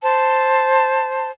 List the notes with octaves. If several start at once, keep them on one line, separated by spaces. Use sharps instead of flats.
C5 A5